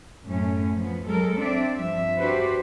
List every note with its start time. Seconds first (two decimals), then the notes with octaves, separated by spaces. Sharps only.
0.27 F#2 A2 A3 C#4
0.75 F3 B3
1.06 F#3 G#3 A4 A#4
1.38 C4 D4 D5 E5
1.75 G2 F3 E5
2.18 D4 F#4 G4 B4 C5